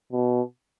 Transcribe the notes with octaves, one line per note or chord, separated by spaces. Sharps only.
B2